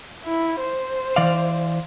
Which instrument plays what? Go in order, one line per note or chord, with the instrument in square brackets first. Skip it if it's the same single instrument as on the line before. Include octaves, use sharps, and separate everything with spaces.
[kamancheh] E4
C5
[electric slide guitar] E3 D5 F5